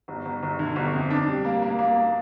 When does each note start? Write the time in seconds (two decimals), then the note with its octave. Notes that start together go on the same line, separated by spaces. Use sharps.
0.08 G1
0.25 G1
0.43 G1
0.59 D3
0.76 G1
0.93 F2
1.10 D4
1.27 G3
1.45 A#3
1.62 A#3
1.79 A#3
1.96 A#3